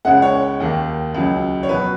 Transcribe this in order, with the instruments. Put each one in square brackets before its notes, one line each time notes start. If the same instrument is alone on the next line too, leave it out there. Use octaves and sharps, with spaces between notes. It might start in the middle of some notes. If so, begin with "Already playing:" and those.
[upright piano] C#2 C#3 G#3 C#4 F#5
C#5
D#2 D#3 A#3
C#2 C#3 F#3
C#5
B2 F#3 B4